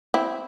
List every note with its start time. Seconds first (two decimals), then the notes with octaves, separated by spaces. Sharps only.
0.14 C4 E4